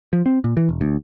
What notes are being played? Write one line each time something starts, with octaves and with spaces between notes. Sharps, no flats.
F3
C4
A#2
E3
E1
D2